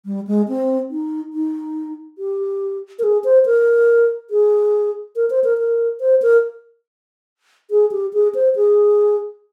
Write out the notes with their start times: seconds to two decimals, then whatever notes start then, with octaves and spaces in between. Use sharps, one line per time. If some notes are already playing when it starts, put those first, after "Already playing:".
0.06 G3
0.27 G#3
0.48 C4
0.91 D#4
1.33 D#4
2.18 G4
2.99 A#4
3.03 G#4
3.24 C5
3.46 A#4
4.30 G#4
5.16 A#4
5.30 C5
5.44 A#4
5.58 A#4
6.01 C5
6.22 A#4
7.71 G#4
7.92 G4
8.13 G#4
8.35 C5
8.56 G#4